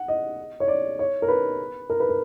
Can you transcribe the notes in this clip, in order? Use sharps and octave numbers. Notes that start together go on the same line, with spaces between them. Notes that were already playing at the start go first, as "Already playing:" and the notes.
Already playing: F#5
D#5
C#5
D5
C#5
A#4
B4
A#4
B4
A#4